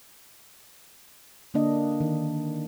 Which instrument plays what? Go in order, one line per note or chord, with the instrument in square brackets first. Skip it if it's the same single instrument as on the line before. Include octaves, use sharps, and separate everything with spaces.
[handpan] D3 A#3 D4 D#5
D#3